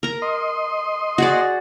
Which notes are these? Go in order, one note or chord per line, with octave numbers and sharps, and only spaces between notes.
A#4 A#5
D#5 C6
F#4 G#4 D5